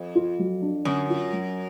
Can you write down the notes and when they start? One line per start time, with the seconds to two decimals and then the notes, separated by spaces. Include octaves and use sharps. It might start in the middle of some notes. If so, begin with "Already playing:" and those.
Already playing: F2
0.15 F4
0.39 F#3
0.62 D4
0.85 F#2 D3
1.10 F4
1.33 F#3